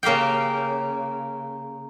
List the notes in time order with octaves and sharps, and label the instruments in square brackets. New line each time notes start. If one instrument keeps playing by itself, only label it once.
[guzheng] C#3 A#3 G4 F5 G5